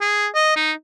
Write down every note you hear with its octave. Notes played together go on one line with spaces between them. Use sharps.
G#4
D#5
D#4